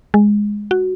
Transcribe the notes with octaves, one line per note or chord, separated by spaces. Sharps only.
G#3
F#4